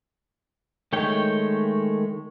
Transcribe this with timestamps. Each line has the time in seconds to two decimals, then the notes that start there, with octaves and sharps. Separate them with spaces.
0.93 D#3 G#3 A3 C#5 G5